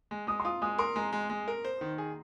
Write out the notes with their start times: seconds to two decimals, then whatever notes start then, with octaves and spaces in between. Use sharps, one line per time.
0.11 G#3
0.27 G#3 D#6
0.40 C6
0.45 F4 D#6
0.62 G#3 D#6
0.78 A#4 C6
0.96 G#3 A#5
1.13 G#3
1.30 G#3
1.48 A#4
1.65 C5
1.81 D#3
1.98 G#4